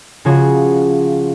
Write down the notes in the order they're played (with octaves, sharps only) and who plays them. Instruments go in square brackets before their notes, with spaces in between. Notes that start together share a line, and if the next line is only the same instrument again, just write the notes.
[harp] C#3 F3 F4 F#4 G#4 C#5